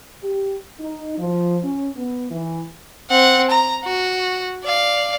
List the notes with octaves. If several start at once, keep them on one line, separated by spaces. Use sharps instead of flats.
G4
D#4
F3
C#4
B3
E3
C4 F#5
A#5
F#4
D5 F5